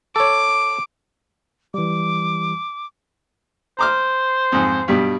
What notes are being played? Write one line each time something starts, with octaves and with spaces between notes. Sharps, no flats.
A4 C#5 D6
E3 G3 D6
C5 A#5 D6 F6
F2 G#2
G2 B2 G3